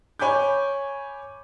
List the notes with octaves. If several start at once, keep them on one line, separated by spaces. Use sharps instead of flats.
C#5 G#5 B5 D6 G6